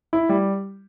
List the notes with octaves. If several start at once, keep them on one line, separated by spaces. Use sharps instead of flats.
E4
G3